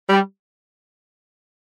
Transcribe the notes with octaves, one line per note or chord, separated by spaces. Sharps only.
G3